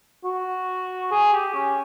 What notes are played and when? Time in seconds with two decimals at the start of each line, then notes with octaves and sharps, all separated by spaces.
0.24 F#4
1.11 G#4
1.33 G4
1.55 C#4